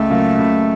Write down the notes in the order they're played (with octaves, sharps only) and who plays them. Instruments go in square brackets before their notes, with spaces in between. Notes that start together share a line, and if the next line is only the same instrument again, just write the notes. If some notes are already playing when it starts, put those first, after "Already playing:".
Already playing: [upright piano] C#2 [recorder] A3
[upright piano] C#3 F#3 A#3 F4
C#2